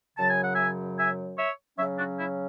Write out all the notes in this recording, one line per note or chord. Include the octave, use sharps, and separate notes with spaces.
F#2 C#3 F#3 A5
G#5
F#5
E5 G#5
E5 G#5
C#5 E5
C#3 F#3 C#4 C#5 E5
D4 F#4
E4